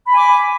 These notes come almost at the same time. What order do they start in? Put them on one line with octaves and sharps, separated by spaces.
B5 G#5 D6